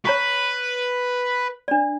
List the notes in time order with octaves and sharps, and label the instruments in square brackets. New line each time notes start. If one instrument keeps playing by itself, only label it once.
[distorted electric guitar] B4 [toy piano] C#5 A#5 C#6
[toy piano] D4 D5